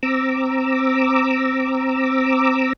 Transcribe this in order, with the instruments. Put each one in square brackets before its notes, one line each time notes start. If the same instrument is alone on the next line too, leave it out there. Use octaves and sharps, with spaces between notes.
[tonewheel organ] C4 A#5 D6 E6